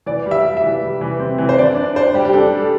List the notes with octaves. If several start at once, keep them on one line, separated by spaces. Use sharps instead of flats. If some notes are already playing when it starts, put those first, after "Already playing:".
E3 D5
G3
E5
G3
E5
E3
G3
E3
C4
E3
C5
D4 D5
D4
D4 C5
G3 G4
G4
D4 A4
G3
A4